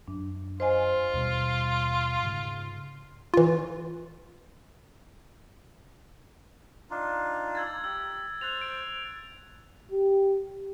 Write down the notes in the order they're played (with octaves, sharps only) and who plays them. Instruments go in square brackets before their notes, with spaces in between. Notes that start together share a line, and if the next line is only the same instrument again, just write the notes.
[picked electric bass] F#2 [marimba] D4
[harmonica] F4 [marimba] C5 D#5 G#5
[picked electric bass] D#2 B2 G3
G#2 C#3
[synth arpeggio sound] E3 F4
[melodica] D4 D#4 F4
[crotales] E6 G#6 A6
[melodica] G4 [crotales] E6
[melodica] C5 [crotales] F#6 A6 F7
[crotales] D7
[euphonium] G4